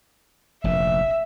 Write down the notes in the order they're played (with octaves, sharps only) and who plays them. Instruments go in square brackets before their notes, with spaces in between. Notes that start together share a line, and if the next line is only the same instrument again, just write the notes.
[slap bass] F1 A#1 A#2 [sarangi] E5